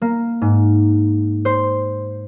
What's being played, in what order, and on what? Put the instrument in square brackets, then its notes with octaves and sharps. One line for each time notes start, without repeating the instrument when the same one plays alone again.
[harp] A#3
G#2
C5